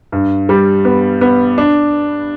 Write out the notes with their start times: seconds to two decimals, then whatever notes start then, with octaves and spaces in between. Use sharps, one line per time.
0.12 G2
0.49 G3
0.85 B3
1.21 B3
1.58 D4